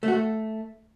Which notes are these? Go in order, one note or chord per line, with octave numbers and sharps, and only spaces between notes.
A3
F#4
A3